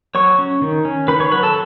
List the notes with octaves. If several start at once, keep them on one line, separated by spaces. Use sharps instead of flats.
F#3 C#5 C#6
C#4
D#3
C#4
D#3 B4 B5
C#5 C#6
F#3 B4 B5
A4 A5